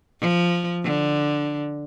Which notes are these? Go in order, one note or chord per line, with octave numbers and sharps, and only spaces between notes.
F3
D3